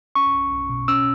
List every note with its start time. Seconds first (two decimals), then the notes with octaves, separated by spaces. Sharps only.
0.15 C#4 C#6
0.34 B1
0.52 B1
0.69 B2
0.88 C#4 E6